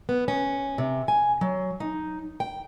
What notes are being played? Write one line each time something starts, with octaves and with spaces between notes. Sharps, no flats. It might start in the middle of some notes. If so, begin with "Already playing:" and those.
B3
C#4
C3
G#5
F#3
D#4
G5